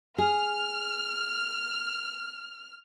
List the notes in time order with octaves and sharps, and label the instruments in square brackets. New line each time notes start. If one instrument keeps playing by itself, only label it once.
[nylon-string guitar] G#4 [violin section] F6